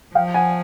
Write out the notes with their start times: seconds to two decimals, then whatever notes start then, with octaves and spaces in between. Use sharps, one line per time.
0.15 F3 F5 G5
0.34 F#5 G#5